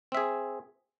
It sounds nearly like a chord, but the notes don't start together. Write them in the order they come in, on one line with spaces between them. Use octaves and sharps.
C4 E5 G#4